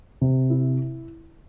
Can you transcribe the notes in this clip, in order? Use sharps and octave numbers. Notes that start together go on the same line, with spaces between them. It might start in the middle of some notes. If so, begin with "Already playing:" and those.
C3
E4